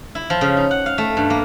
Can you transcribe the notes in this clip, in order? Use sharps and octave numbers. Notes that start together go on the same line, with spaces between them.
E4
F3
C#3
D#4
F#5
F5
A3
G2
A#3